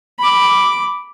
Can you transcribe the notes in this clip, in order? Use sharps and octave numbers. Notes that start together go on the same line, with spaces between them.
B5 D6